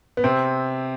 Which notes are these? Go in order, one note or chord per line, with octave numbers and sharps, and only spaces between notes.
B3
C3 C4